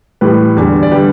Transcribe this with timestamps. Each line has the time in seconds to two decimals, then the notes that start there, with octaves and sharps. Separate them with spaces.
0.21 A2 E3 G3 G4 B4
0.57 E2 D3 G3
0.83 D5
0.91 D3 G3 G4 B4